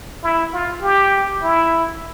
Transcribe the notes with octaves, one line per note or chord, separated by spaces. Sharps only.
E4
F4
G4
E4